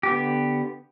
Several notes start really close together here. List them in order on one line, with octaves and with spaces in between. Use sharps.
G4 B3 D3